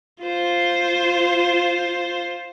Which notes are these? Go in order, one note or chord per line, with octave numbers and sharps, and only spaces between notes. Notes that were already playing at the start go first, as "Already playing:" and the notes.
F4 C5